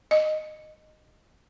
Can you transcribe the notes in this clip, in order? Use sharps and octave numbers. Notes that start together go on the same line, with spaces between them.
D#5